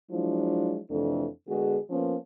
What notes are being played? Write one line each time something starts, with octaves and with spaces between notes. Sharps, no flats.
F3 F#3 G#3 D4 E4 F4
F2 C3 E3 A3 D4 A4
D3 G#3 B3 F#4 G#4
F3 A#3 B3 C#4